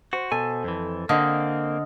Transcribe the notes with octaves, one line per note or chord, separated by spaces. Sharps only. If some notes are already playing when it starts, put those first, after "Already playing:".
F#4 C5
B2 A4 G#5
F2 E3
D3 A#3 C4 D#5 F5